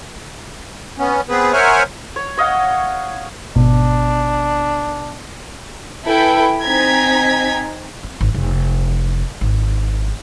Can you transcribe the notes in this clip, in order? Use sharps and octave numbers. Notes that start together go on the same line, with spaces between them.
B3 C#4
B3 C4 G#4 B4
A#4 C5 C#5 E5 F#5 G#5
C#5
C#5 D#5 F5 F#5
G#1 B2 D4
E4 A4 B4 G5 G#5 B5
C4 D#4 G#5 A#5 G#6 B6
C4
G#1
F1
G#1